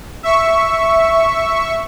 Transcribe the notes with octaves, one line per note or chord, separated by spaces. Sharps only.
E5 C#6